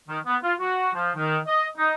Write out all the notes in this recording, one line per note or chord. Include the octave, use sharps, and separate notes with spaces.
D#3
B3
F4
F#4
F3
D#3
D#5
D#4